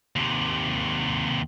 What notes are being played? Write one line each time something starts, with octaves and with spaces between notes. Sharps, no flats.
D#2 C3